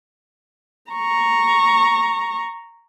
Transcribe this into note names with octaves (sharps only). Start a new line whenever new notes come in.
A#5 C#6